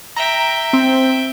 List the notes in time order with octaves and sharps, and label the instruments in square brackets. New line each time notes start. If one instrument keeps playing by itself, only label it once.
[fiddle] E5 G5 [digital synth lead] A#5
[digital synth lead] C4